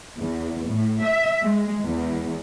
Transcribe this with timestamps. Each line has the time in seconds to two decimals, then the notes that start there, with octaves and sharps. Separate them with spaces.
0.18 E2
0.68 A2
1.03 E5
1.42 G#3
1.82 E2